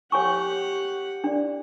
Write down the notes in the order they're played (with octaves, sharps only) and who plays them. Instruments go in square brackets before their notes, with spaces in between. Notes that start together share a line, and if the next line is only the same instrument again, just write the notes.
[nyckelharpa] G4 F#5 [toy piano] C#5 G#5 C#6
[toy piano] D4 D5